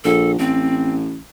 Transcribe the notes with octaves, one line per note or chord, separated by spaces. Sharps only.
A#1 A4
A1 C4